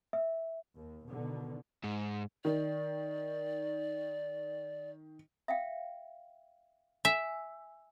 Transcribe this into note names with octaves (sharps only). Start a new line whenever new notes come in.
E5
D#2
B2 D3 D#3
G#2
D#3 D5
E5 F5 G5
E5 G#5